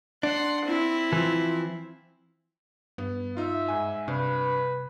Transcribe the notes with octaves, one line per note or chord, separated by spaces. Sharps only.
D4 F#5 C6
C4 E4
E3 F3
G2 B3
D#4 F4 E5
G#2 G#5
G2 C3 B4